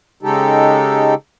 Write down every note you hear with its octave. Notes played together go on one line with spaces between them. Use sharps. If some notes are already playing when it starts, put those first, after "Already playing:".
C#3 G#3 D#4 G4 A4